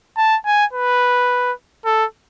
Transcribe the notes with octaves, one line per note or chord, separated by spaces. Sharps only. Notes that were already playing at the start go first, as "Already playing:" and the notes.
A5
G#5
B4
A4